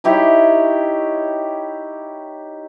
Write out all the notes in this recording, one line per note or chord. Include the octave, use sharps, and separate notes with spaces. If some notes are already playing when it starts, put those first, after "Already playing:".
D#4 E4 G4 C#5